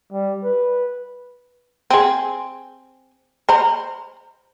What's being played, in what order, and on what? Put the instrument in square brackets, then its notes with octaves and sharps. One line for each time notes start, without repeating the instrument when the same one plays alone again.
[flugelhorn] G3
B4
[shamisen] C4 G#4
C5 A#5 B5